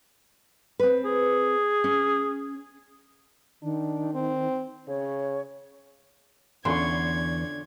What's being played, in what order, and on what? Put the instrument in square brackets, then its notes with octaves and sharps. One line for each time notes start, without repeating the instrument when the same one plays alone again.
[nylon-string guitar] C4 B4
[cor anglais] G#4
[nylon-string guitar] C#4
[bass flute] D#3 [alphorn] D4
[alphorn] C4
[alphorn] C#3 [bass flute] C#5
[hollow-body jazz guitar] E2 [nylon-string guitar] D3 C#4 F4 [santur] C6 C#6 [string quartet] G#6